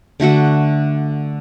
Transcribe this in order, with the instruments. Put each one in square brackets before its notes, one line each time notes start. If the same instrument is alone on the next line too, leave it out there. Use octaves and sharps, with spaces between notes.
[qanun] D3 A3 F#4 A4